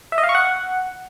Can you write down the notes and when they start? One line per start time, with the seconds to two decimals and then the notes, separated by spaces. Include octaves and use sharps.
0.12 E5
0.18 D#5
0.23 F5
0.29 C#6
0.35 F#5